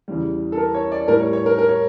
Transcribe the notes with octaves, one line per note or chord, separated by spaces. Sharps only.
E2 C#3 E3 G3
A4
A#4
C#5
D5
A2 G3 A#4
C#5
C#5
A#4
A#4
C#5